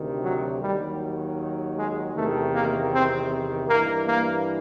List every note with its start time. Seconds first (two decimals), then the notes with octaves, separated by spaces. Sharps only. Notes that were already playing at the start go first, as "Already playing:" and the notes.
Already playing: D2 C3 D#3
0.23 F#3
0.61 D#2 D#3 F#3 G3
1.76 G#3
2.15 E2 C3 D#3 A3
2.53 A#3
2.92 C4
3.69 G2 E3 A#3
4.07 A#3